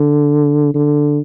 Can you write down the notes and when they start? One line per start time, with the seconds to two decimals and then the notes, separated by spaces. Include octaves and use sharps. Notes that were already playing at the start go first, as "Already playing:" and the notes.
Already playing: D3
0.74 D3